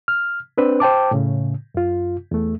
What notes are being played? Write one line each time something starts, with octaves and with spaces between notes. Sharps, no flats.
F6
C4 D4 B4 C5
C5 G5 A5 D6
A2 C#3
F#2 F4
E2 A3